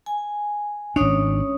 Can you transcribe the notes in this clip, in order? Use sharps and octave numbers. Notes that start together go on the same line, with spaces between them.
G#5
G#1 C#4 D4 C#5 D#6